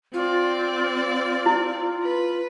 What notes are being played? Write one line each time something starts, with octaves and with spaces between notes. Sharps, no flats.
C4 F4 D5
E4
B4